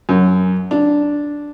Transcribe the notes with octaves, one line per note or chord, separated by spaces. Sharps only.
F#2
D4